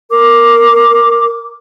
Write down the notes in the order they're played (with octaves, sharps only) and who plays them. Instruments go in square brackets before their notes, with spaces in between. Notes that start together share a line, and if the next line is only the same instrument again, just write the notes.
[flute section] A#4 D6